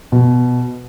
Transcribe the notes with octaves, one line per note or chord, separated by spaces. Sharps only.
B2